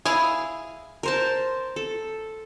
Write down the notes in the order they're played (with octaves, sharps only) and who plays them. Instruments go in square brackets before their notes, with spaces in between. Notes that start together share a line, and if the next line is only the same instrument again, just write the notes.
[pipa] E4 G#4 [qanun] F5
[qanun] A#4 C5 A5
A4